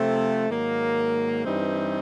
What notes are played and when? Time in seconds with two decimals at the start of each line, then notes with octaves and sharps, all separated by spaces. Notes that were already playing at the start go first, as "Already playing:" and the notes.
Already playing: C3 F3 A3 C4
0.48 G#2 D#3 F#3 A#3
1.45 G2 E3 G3 C4 D#4